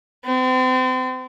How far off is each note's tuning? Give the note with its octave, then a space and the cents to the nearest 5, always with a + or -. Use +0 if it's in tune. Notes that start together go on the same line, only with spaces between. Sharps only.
C4 -35